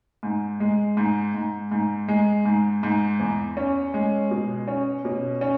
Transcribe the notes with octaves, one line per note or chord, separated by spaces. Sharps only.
G#2
G#3
G#2
G#2
G#2
G#3
G#2
G#2
E2
C#4
G#3
B2
C#4
B2
C#4